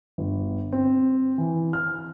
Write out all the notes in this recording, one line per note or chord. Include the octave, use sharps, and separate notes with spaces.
G1
C4
E3
F6